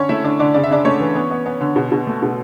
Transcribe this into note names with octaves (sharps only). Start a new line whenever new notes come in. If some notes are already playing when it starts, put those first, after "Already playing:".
Already playing: D3 C#4 C#5
A3 E4 E5
D3 D4 D5
D3 D4 D5
C#3 D5
E5
C#3 D4 D5
A3 C#4 C#5
E3
B3
B3
B3
D3
B2
B2
A3
B2